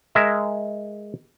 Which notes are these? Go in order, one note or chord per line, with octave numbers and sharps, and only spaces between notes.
G#3 A#4 E5